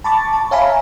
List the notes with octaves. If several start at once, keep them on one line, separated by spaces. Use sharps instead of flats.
A5 B5 C#6 D6 A6
A5
C#5 E5 F5 G#5 A#5 B5